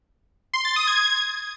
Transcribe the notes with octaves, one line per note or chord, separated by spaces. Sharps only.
C6
A6
D#6
G#6